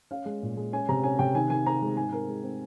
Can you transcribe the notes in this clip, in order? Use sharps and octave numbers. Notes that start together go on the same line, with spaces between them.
C#4 F5
G#3
A#2
G#3
C#4 G#5
C3 A#5
C#4 G#5
C3 G5
D#3 G#5
D#3 G#5
C4 A#5
G#3
G#2 G#5
C4 A#4
G#3
C4